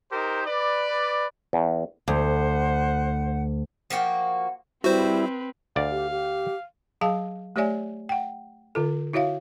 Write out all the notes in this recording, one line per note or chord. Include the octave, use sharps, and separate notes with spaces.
D#4 G4 A#4 C5
B4 D5
E2
D2 C5 F#5
F3 A#3 F#4 G5
G3 C4 E4 F#4 B4 C5
D2 D5 F5
G4
G4
F#3 G#4 F5 A5
A3 G4 C#5 D5 E5 G#5
F#5 G5
D3 F4 A4
E4 F#4 C#5 E5 F5